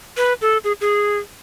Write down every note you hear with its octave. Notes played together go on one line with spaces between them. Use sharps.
B4
A4
G#4
G#4